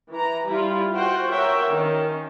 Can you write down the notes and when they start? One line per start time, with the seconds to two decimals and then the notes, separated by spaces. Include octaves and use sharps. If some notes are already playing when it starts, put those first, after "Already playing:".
0.11 E3 A#5
0.47 G3 E4 F4
0.94 F4 F#4 C5 F#5 G5
1.30 F#4 A#4 C#5 E5 G5
1.74 D#3 C#4